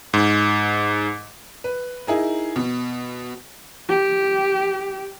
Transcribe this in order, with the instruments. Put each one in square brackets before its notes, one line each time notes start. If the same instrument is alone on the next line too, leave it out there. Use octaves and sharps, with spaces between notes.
[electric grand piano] G#2
[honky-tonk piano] B4
D#4 E4 G#4 A#4
B2
[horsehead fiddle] G4